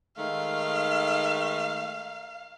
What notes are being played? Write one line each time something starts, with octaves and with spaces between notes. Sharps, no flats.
D#3 G#3 A3 F5